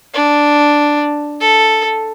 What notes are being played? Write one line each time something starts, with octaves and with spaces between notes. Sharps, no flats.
D4
A4